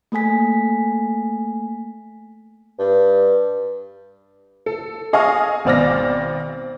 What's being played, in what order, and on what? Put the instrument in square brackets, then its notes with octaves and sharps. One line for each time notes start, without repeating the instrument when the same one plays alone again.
[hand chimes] A3 A#3 A4 G#5 B6
[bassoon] G2
[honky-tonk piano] A4
G#4 D#5 F5 G#5 C#6 F6
G#1 B2 C4 D5 F6 A#6